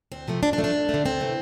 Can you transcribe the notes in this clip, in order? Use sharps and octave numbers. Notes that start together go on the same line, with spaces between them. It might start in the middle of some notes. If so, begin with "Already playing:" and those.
D2 C4
C3 F3 A3
A#2 D4
D4
F3 A3
D4
D2
D3 A3
D2 C4
C3 E3 A3